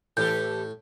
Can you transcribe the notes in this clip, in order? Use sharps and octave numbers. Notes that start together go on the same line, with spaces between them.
A2 E3 G4 A4 G6